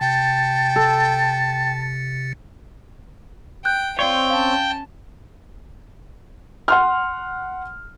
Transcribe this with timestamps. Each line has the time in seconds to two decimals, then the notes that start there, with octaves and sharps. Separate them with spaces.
0.01 C3 G5 A5 A6 C#7
0.76 A4
3.65 G5 F#6 G6
3.99 C4 F4 C#5 D5 G5
4.30 C#4 F5 A5
6.68 F#5 C6 F6